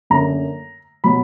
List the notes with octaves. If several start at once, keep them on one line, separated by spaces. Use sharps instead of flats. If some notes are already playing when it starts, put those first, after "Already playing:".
F#2 D3 A#3 A#5
B2 F#3 B5